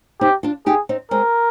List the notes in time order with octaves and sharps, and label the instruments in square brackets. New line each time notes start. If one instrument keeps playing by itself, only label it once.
[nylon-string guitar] C4 D#4 [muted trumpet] G4
[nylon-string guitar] D4 F4
[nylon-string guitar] D#4 G4 [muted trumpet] G#4
[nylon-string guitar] C4 D#4
[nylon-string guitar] G#3 C4 [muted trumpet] A#4